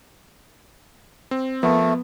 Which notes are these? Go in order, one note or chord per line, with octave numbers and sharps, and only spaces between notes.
C4
F3 A3 B3 A#4